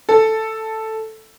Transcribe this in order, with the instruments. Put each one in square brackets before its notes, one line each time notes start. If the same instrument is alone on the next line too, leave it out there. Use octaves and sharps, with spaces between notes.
[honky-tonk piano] A4